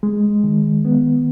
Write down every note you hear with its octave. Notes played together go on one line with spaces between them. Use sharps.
G#3
D#3
B3